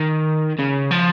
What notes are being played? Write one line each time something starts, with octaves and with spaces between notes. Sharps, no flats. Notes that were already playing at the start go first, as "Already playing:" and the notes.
Already playing: D#3
C#3
F3